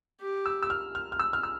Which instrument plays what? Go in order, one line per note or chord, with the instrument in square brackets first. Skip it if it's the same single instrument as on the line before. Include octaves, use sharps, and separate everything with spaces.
[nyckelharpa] G4
[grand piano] E6
E6
F6
F6
F6
E6
F6
E6